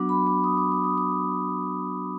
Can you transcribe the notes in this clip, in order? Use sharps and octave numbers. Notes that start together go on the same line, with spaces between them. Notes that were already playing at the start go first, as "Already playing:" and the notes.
Already playing: F#3 B3 D4 F#4 D6
B5
D6
D#6
D6
D6
D#6
D6